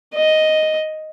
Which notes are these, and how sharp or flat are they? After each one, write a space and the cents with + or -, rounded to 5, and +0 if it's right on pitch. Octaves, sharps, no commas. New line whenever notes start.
D#5 +0